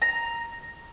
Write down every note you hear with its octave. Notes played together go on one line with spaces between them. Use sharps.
A#5